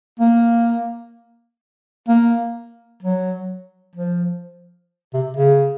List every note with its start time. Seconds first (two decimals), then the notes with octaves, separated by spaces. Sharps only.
0.19 A#3
2.08 A#3
3.03 F#3
3.95 F3
5.14 C3
5.36 C#3